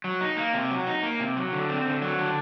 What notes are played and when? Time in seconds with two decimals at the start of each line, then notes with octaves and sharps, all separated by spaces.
0.04 F#3
0.21 D#4
0.37 A#3
0.53 C3
0.70 F#3
0.87 D#4
1.03 A#3
1.20 C3
1.37 F#3
1.52 D3
1.69 C4
1.86 D3
2.02 F#3
2.19 D3